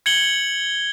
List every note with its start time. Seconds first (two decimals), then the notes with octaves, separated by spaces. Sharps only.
0.06 G#6 C#7 F#7 G7